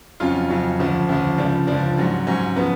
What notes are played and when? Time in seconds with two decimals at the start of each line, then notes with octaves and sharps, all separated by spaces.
0.20 F2 C#3 F#3 C#4 F4
0.50 F2 C#3 F#3 C#4
0.79 D2 C#3 F3
1.09 D2 C#3 F3
1.38 C#2 C#3 F3 D4
1.67 C#2 C#3 F3 D4
1.98 G#2 F#3 C#4
2.27 G#2 F#3 C#4
2.56 C#3 F3 B3